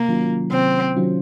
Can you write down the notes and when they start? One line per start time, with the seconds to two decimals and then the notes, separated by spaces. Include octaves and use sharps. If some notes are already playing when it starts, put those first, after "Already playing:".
Already playing: C3 A#3
0.09 D#3 F#3 C#4 F4
0.52 C3 C4
0.96 D#3 F#3 C#4 F4